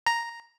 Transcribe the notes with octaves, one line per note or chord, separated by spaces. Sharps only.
A#5